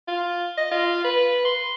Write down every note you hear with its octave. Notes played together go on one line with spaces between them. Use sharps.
F4
D#5
F4
B4
C6